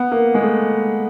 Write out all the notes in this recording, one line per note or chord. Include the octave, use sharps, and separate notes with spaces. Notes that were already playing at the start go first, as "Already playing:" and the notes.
Already playing: B3
A#3
G#3
A3